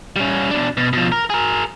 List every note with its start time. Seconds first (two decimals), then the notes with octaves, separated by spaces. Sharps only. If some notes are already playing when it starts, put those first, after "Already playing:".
0.16 G3 C#4
0.51 B2 D4
0.77 B2
0.93 B2 F3
1.12 A#4
1.30 G#4 A#4